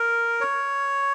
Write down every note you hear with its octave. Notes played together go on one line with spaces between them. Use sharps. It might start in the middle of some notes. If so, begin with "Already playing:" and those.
Already playing: A#4
C#5